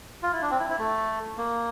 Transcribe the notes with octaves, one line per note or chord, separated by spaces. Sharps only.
F4
E4
D4
C4
E4
E4
A3
A#3